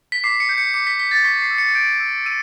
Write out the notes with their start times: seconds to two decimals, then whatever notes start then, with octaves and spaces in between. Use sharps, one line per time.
0.12 B6
0.24 D6 C7
0.40 C#7
0.49 G6
0.58 C#7
0.74 D6 C#7
0.87 B6
0.99 G6 B6
1.11 A6
1.24 C#6 B6
1.42 C7
1.50 E6
1.58 C#7
1.75 G6 D7
2.00 E6
2.26 E6 D#7